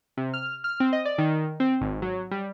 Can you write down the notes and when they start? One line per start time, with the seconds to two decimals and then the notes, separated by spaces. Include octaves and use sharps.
0.17 C3
0.34 F6
0.64 F6
0.80 C4
0.93 D#5
1.05 D5
1.18 D#3
1.60 C4
1.81 G#1
2.02 F#3
2.31 G3